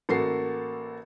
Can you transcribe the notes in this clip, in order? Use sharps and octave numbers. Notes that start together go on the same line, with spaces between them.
A1 A#3 F#4 A4 C7